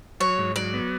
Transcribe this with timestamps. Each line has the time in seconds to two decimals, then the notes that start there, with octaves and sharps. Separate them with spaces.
0.20 F#3 C#5
0.38 G#2
0.56 F#3 D5
0.73 B3